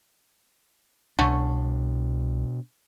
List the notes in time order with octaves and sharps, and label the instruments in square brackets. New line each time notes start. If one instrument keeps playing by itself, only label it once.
[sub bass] C2 [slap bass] B2 D4 [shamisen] D3 A3 C#4